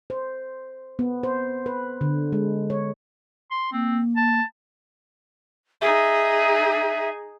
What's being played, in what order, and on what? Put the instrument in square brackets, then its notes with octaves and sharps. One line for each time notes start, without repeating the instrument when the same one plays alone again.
[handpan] C5
B3
C5
B4
D3
G#3
C#5
[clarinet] C6
[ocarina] A#3 [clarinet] C4
[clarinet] A5
[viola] D#4 G#4 [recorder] E5